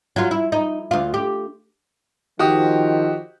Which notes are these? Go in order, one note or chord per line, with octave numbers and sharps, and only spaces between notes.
F#3 F4
E4
D#4
D2 F4
G4
D#3 F3 F#4 G4 D#6